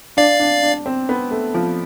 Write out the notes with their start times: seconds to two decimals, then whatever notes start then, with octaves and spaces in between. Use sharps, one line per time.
0.17 D4 D5 F5
0.40 D4
0.63 D4
0.86 C4
1.09 B3
1.31 A3
1.54 F3